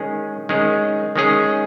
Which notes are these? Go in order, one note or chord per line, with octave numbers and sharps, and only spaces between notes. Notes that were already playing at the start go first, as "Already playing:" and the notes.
Already playing: D#3 G#3 C#4 G#4
D#3 G#3 C#4 G#4
D#3 G#3 C#4 G#4